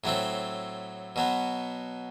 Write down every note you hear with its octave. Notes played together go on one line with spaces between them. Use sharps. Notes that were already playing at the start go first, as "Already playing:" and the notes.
A2 F#3 A3 C4
B2 F#3 B3